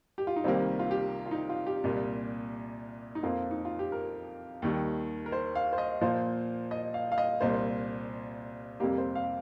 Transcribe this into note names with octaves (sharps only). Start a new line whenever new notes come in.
G4
F4
D#4
C2 C3 D#3 G3 A#3 C4
F4
G4
F4
D#4
F4
G4
C2 A#2 G3 A#3
D#4
F2 F3 A#3 F4
D#4
F4
G4
A#4
D#2 D#3 G3
A#4
C5
F5
C5
D#5
A#2 F3 A#3 C5
D#5
F5
F5
D#5
C2 A#2 A#3 C5
F2 C3 G3 A#3 G4
C5
F5